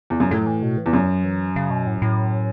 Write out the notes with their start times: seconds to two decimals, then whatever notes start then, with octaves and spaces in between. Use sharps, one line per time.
0.10 E2
0.20 F#2
0.31 A2 F#3
0.46 E3
0.63 B2
0.77 E3
0.86 E2
0.93 F#2 F#3
1.24 E3
1.56 C#3
1.71 B2
1.87 A2
2.02 A2